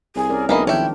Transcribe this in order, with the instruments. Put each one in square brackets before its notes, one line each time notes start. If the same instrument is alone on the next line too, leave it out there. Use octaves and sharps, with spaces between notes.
[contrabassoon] C2 [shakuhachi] G#4
[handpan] C#4 A#4 D5
[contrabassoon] B1 [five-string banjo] E3 A#3 D#5 [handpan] G#3 C4 D4 [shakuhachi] B5
[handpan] D#3 F3 [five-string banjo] E4 C#5 [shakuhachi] G5